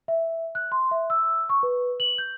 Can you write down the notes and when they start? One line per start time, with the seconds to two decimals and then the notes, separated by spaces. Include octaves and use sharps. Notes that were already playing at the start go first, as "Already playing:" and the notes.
0.08 E5
0.55 F#6
0.72 C6
0.91 E5
1.10 E6
1.49 C#6
1.63 B4
2.00 F#7
2.18 G6